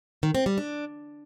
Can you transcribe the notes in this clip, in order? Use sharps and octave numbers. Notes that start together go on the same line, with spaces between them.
D#3
C4
G3
D4